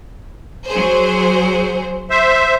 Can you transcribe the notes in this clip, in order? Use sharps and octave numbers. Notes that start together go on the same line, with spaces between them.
F#3 G#4 C5
C5 E5